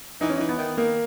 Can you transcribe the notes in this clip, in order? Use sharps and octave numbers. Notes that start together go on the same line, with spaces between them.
E3 D#4
C#4
E3 D#4
B3
D#3
D#3 A#3